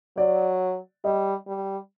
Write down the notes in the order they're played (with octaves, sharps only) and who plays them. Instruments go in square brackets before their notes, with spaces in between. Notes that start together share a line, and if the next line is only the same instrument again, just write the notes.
[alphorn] F#3 [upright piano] D5
[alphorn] G3 [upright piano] D#5
[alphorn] G3